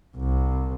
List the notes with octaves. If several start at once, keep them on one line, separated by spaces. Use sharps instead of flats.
C2